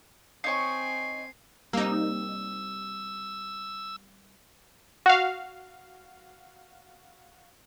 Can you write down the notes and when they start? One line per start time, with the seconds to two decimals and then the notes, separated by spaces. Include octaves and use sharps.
0.44 C4 D#4 C#5 G#5 C#6 C7
1.73 G3 A#3 C4 D#4 E6
5.06 F#4 F5